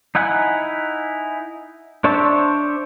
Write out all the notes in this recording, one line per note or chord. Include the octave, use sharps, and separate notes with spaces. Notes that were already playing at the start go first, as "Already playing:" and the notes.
D#4 E4 F#5 G#5
D4 C5 C#5 E5 A5